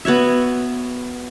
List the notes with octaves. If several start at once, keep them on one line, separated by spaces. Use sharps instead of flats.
B3 F#4 C#5 E5